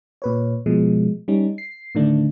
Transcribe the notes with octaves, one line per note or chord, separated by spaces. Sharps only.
A#2 B4 C#5
B2 F3 G#3
G3 C#4 D#4
C7
A2 D3 D#3 A3 D4